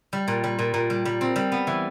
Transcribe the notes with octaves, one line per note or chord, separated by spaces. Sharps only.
G3
A#2
G3
A#2
A#2
G3
G3
C4
G3
B3
E3